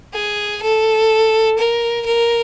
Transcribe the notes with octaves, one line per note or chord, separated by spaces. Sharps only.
G#4
A4
A#4
A#4